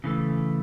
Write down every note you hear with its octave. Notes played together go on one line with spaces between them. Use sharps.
C#3 E3 A3